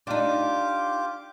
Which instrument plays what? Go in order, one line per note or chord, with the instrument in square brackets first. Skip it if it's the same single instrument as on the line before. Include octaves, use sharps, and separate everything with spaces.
[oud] D4 D#4 [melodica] F4 G4 D6